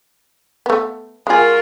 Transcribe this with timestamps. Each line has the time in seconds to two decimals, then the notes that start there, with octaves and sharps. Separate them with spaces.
0.66 A3 B3
1.27 G#3 F4 F#4 G#4 A#4